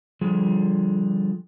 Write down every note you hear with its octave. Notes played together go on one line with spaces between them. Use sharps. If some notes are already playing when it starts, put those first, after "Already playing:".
D3 F3 G3 F4 G#4